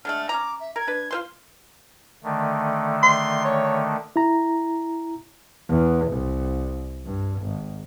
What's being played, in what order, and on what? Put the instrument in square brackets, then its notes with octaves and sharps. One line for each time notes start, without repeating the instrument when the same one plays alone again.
[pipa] D3 G#3 A3 [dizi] F6
[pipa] C#4 E4 A#5 [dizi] D6
[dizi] E5
[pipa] A#4 [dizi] G#6
[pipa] D4 B4
F4 C5 C6
[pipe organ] D3 D#3 A3
[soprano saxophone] C6
C#5
[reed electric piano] E4 A#5
[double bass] E2
C2
G2
G#1